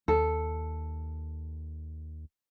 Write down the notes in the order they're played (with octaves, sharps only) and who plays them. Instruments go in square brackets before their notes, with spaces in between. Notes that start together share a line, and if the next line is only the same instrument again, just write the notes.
[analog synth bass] D#2 [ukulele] A4